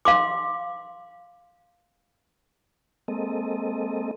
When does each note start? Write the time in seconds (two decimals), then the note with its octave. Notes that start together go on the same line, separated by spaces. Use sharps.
0.05 F5 C6 D6
3.08 G#3 A#3 C4 A4 D#5